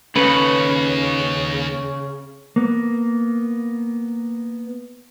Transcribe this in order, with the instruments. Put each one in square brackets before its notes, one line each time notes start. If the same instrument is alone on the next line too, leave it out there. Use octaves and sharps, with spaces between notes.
[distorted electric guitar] D#2 [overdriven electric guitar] C#3 [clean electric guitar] C#4 A4 B4
[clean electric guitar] A#3 B3